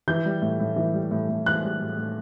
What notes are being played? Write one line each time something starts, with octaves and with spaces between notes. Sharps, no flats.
E3 G6
G3
A2
A2
E3
G3
A2
A2
E3 F#6
G3
A2
A2